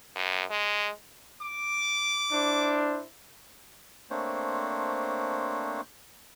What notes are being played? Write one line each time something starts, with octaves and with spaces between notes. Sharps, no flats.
F#2
G#3
D6
D4 E4 C5
A3 A#3 C4 D4 C5 C#5